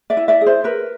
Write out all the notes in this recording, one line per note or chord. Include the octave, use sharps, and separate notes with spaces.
D5 E5
E4
D5 E5
G#4
C5
A#4 B4